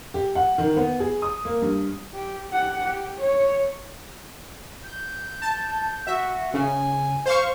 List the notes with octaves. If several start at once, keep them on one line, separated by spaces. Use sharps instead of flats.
G4
F#5
D#3
B3
G#4
D#6
A#3
G2
G4
G4 F#5
G4
C#5
G6
A5
F#4 E5
C#3 G#5
C5 F5 C#6